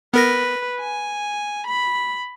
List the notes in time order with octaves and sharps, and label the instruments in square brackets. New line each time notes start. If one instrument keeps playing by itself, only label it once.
[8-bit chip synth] B3 A#4 A#6 [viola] B4
[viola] G#5
B5